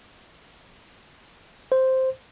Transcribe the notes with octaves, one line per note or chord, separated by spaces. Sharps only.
C5